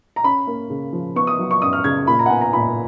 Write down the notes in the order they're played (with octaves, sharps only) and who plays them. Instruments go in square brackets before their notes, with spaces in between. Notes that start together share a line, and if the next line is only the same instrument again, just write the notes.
[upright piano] A#5
C#4 B5
A#3
C#3
F3
B3 C#6
D#6
F#3
C#6
F#2 D#6
F6
C#3 G#6
A#2 B5
A#5
F#5
B3 G#5
A#5
A#2 B5